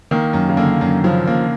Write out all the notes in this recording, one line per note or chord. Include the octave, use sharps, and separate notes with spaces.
D#3 A#3
F#2
C#3
D3 A#3
F#2
C#3 F3
A#3